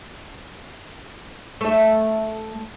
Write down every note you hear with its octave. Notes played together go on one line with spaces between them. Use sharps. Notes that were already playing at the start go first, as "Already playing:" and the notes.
A3 E5